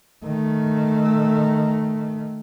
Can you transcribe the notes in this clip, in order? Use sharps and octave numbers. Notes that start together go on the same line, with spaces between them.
D#3 A3